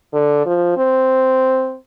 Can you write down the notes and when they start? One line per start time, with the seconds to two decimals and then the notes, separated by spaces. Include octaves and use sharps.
0.13 D3
0.46 F3
0.77 C4